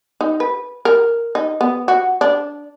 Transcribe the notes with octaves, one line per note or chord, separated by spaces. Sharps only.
D#4
B4
A#4
D#4
B3
F#4
D4